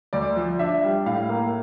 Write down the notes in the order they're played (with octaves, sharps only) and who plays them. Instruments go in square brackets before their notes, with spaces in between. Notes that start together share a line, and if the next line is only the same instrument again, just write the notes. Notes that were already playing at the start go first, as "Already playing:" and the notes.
[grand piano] D2 D5
F3
D4 E5
G3
A2 F5
A#3